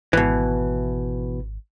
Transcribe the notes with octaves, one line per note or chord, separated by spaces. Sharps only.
G#1 B2 E3